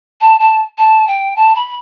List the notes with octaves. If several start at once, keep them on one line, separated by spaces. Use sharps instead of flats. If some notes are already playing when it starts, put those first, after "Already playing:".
A5
A5
A5
G5
A5
B5